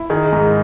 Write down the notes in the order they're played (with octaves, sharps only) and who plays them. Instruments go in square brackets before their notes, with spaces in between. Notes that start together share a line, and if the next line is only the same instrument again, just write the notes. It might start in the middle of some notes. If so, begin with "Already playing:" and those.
Already playing: [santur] E4
[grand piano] D#3 [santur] G#4
[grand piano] G#2